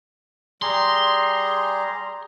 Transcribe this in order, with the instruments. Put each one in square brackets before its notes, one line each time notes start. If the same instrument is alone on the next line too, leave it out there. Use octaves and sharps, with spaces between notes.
[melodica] G3 G#4 A#5 [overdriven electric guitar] C6